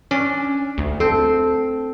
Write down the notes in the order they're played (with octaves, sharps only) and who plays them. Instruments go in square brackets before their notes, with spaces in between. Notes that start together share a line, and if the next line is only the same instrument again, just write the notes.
[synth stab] C#4 [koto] D4
[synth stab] D2
[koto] C4 [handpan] A4